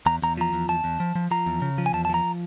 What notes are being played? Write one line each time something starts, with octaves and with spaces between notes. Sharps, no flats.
E2 A#5
E2 A#5
F3 A#5
E2
E2 A5
E2
F3
F3
F3 A#5
E2
C#3
F3
G#5
E2 A5
A5
F3 A#5